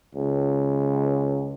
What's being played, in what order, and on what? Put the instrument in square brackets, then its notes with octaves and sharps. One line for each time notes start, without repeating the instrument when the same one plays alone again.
[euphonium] C#2